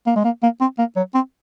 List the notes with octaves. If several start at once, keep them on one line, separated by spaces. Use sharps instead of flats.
A#3
G#3
A#3
A#3
C4
A#3
F#3
C4